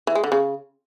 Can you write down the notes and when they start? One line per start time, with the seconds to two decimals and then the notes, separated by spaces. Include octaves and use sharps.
0.07 E3
0.15 G#3
0.24 D3
0.32 C#3